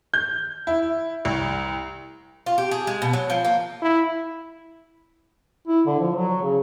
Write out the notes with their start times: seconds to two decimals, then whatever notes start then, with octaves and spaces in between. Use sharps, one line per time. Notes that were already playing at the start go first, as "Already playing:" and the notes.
0.14 G6
0.67 E4
1.25 C2
2.46 F4
2.58 G4
2.71 G#4
2.87 G#3
3.02 B2
3.13 F#3
3.30 F3
3.45 A#3
3.82 E4
5.67 E4
5.86 D3
6.00 F3
6.15 F#3
6.42 C#3